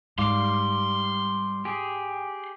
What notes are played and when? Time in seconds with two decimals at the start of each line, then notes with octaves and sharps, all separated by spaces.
0.18 G#2 G3 F5 C6 D6
1.65 G4 G#4